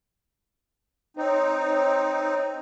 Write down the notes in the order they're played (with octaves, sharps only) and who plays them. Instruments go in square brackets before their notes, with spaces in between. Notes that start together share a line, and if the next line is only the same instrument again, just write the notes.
[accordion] C4 D#4 [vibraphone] C5 C#5